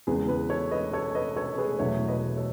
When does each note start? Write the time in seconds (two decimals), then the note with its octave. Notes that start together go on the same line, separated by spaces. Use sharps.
0.07 E2 C#3 G#3 G#4 B4
0.28 G#4 B4
0.50 A4 C#5
0.71 B4 D#5
0.93 A4 C#5
1.15 B4 D#5
1.36 A4 C#5
1.58 G#4 B4
1.79 E2 B2 F#3 A3 C#5 E5
2.08 B4 D#5
2.37 A4 C#5